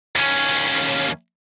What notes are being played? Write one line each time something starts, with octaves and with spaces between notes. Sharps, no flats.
D#2 C#4